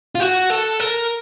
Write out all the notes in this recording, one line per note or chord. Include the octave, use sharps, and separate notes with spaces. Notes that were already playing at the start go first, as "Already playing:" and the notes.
F4
F#4
A4
A#4